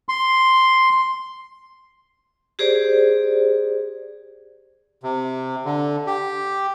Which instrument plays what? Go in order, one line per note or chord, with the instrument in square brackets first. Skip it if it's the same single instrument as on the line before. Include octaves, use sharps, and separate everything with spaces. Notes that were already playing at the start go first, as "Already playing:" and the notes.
[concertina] C6
[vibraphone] G4 G#4 C5 D5
[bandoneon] C3
D3
G4